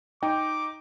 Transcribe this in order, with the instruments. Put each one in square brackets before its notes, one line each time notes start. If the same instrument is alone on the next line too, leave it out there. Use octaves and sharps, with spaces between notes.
[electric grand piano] D#4 [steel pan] G5 [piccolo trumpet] D6